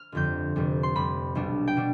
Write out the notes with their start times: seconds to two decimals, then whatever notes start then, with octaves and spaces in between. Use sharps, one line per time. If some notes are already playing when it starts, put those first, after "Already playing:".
Already playing: F6
0.12 G1 F2 D3 F3 C4 G6
0.55 F1 F2 C3 G3
0.83 C6
0.95 F1 F2 C3 G3 B5
1.35 B1 B2 G3 D4
1.67 G5
1.77 B2 G3 D4